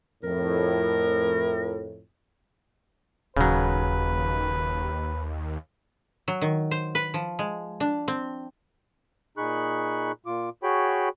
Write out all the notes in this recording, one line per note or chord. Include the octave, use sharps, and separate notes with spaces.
F2 A2 A#4
D#1 D#2 C#3 F#3 B4
F#3
D#3
C5
B4
F3
G#3
D4
C4
A#2 D#4 G#4 B5 C#6 F#6
A#2 F4 D6
F#4 G#4 C#5 G5 B5